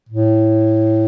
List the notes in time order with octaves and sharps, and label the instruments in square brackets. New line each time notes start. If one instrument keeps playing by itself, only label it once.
[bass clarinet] A2